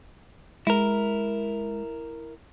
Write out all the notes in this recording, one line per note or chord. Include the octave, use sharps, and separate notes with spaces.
G#3 E4 A#4